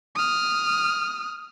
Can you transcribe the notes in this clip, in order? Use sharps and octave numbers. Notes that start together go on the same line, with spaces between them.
D#6 F6